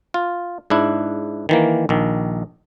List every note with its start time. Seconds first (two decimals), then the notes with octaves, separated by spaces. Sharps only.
0.14 F4
0.70 G#2 D4 E4
1.49 D#3 E3 A#3
1.89 A#1 D#3